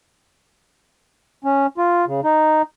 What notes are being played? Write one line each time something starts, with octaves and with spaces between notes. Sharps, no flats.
C#4
F4
C#3
D#4